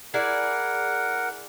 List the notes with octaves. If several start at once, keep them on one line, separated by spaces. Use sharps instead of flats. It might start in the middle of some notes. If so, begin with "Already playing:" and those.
E4 G#4 A#4 D5 F#5